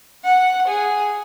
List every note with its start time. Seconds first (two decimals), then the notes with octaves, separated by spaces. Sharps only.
0.25 F#5
0.68 G#4